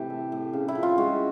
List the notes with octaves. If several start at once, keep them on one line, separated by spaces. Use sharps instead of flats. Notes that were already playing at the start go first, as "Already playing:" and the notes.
Already playing: A2 C3 E3 G4
A3
A2
C#3
E4
F3
F4
G#3 F#4